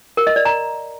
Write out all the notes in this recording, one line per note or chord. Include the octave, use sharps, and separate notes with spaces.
A#4
D#5
D5
A#5